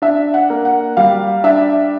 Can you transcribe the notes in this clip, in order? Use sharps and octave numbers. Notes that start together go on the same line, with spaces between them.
D4 E5
F#5
A#3
F#5
G3 F5
D4 E5